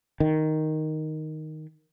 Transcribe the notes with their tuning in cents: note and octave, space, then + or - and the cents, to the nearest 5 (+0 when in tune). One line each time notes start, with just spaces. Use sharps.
D#3 +0